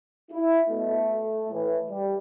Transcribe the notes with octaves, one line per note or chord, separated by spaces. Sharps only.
E4
B2 A3
A2 E3
G3